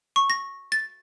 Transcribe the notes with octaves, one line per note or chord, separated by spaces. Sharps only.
C#6
A#6
A6